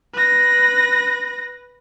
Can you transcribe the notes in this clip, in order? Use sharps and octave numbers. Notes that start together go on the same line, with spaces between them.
B4 A#6